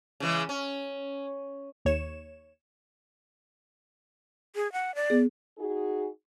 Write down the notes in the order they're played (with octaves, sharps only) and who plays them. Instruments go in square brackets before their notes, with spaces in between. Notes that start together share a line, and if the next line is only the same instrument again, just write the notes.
[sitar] C#3 E3 G#3
C#4
[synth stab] D#2 C#5 E7
[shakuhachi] G#4
F#5
D5
[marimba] B3 G#4
[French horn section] D#4 F#4 G#4